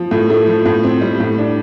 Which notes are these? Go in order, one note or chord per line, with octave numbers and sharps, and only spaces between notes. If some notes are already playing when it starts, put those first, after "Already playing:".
Already playing: F3
A2
A3
F3
A2
C4
G3
A2
D4